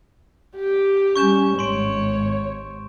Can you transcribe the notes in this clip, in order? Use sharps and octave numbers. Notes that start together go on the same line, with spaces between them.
G4
G3 C#4 C#6 G6 E7
G#1 G#2 C#5 C6 D7